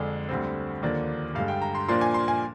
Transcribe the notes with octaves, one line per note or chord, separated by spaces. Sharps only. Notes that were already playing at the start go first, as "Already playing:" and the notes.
Already playing: F2 D3 G#3 D4
D2 D3 G3 C4
D#2 D3 F3 A#3 D4
G2 D3 G#3 F5
G5
A#5
C6
A#2 F3 A#3 D4 C6
G#5
C6
G#5